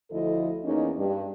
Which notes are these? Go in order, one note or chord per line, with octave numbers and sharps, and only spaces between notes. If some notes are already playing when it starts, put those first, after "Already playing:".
D2 D3 F3 E4 A4 D#5
E2 A#3 C#4 D#4
G2